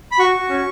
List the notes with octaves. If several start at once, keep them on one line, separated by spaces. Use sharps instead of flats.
B5
F#4 C#6
F#4
C#4